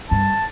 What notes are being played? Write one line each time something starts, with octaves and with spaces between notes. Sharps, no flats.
G2 A5